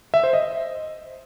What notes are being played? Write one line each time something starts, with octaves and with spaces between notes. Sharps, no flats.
E5
C5
D#5